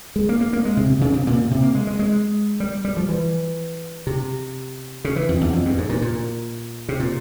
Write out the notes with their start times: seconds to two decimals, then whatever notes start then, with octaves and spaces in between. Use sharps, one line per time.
0.16 G#3
0.29 A#3
0.41 A#3
0.53 A#3
0.65 G#3
0.77 C3
0.89 C3
1.01 C#3
1.14 C3
1.27 A#2
1.38 A#2
1.51 C3
1.63 A#3
1.75 G#3
1.87 G#3
1.99 G#3
2.60 G3
2.85 G3
2.97 F3
3.09 E3
4.07 C3
5.05 C#3
5.16 E3
5.29 F2
5.41 E2
5.53 F2
5.65 G2
5.78 G#2
5.89 A#2
6.02 A#2
6.89 C3
7.00 A#2